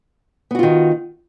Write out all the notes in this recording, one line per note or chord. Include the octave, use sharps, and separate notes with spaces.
D#3 B3 F4 F#4